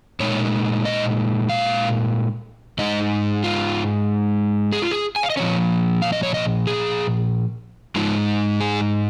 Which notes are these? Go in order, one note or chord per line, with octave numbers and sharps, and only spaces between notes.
A#2 G#3 D#4 C#5
D#5
F5
G#2 G#3 D#4 D#5
F4
G#4
F4
G#4
G#5
F5
D#5
A#2 F3 G#3 C#4 C#5
F5
D#5
C#5
D#5
G#4
G#2 G#3 D#4 F4
G#4